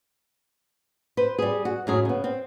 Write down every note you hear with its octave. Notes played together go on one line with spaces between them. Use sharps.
B4 C5
G3 G#4
F#4
F#2 A2 G#4
C#3 B3
C4